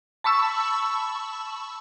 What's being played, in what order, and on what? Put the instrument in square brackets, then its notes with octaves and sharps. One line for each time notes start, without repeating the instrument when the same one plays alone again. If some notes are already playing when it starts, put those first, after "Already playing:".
[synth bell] A5 B5 C#6 E6